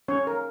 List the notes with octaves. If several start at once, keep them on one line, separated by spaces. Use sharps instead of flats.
C#4 C#5
A#4